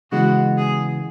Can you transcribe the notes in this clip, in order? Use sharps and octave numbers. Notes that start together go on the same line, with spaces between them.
C#3 E3 G#3 B3 F#4
G#4